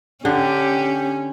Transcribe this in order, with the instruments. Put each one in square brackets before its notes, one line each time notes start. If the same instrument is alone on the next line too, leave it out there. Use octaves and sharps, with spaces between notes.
[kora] D3 [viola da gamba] C#4 [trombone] G4